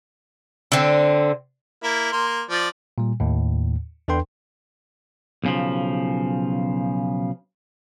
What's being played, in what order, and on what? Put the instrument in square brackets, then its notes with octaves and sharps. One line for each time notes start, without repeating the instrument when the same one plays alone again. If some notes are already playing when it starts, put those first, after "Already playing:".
[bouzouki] D3 C4
[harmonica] A#3 E4
A#3 C6
F3 D5
[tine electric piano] A#2 G3
D#2 A2
E2 D4 A4 B4 G5 C6
[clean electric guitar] B1 C#3 F3